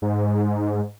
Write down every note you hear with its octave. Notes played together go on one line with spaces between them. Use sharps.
G#2